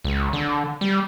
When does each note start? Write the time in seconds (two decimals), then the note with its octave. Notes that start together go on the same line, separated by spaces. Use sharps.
0.04 C#2
0.33 D3
0.81 G3